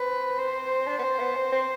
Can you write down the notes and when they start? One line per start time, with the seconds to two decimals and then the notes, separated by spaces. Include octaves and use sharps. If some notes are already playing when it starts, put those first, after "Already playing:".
Already playing: C4 B4
0.39 C5
0.87 D4
0.99 B3
1.04 C4
1.19 B3
1.36 C4
1.52 C4